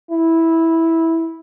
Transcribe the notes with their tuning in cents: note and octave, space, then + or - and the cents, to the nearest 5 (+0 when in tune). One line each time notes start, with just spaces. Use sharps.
E4 -10